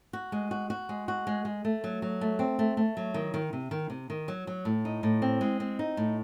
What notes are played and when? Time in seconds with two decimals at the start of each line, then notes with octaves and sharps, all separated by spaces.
0.13 F#4
0.32 G#3
0.51 F#4
0.70 F#4
0.89 G#3
1.08 F#4
1.27 G#3
1.45 G#3
1.65 A3
1.84 F#3
2.02 F#3
2.21 A3
2.39 C4
2.59 A3
2.77 A3
2.97 F#3
3.14 D#3
3.34 D#3
3.53 C3
3.71 D#3
3.90 C3
4.10 D#3
4.28 F#3
4.47 F#3
4.65 A2
4.85 D#4
5.03 A2
5.22 C4
5.41 G#3
5.60 C4
5.79 D#4
5.97 A2